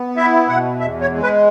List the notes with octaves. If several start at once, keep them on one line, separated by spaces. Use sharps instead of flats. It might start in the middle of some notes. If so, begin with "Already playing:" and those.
Already playing: B3
E4 E5
B2 F#5
E2 E5
C#5
G#3
B4